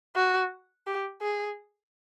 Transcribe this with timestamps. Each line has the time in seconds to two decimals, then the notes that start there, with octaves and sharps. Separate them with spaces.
0.16 F#4
0.87 G4
1.22 G#4